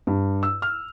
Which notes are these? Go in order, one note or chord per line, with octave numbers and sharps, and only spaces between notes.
G2
E6
F6